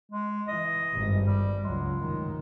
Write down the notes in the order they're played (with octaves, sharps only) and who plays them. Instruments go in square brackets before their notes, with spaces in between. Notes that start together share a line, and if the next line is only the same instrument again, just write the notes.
[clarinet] G#3
[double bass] E3 [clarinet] D#5
[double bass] G#1 G2
[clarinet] G3
[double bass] C#2 F#3 [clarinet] G#3
[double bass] F1 D#3